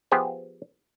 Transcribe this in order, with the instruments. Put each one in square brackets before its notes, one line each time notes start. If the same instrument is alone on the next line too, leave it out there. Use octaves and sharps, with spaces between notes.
[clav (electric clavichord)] F3 B3 G4 G#4 C5